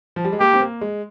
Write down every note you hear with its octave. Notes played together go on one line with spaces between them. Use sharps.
F3
G3
G#3
A#3 G4
C4
A#3
G#3